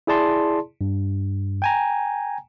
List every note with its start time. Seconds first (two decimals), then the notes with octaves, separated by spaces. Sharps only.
0.07 E4 G#4 D5 A5 C6
0.81 G2
1.62 G5 G#5 A#5